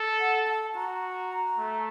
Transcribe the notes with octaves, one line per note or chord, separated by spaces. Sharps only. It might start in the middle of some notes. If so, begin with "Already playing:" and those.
Already playing: A4
F#5
A5
F#4 A#5
A3